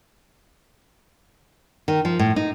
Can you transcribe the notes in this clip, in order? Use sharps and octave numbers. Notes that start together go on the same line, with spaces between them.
D#3
F3
A2
D#4